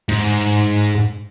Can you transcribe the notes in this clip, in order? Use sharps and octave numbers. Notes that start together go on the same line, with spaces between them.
G#2